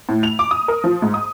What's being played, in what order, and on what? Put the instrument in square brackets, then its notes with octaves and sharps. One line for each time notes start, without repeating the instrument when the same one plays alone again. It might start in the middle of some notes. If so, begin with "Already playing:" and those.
[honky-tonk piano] A2
F7
D6
D#6
A#4
F3
G#2
D#6